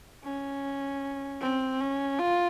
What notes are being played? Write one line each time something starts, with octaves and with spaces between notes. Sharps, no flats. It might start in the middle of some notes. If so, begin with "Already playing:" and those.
C#4
C4
C#4
F4